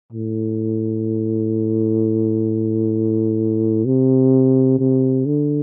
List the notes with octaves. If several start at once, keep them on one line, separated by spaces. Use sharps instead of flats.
A2
C3
C3
D3